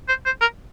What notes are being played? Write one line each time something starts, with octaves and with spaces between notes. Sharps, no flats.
C5
C5
A#4